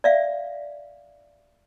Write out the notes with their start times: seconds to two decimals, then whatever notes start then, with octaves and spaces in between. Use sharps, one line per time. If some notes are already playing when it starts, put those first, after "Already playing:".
0.04 D5 E5 F5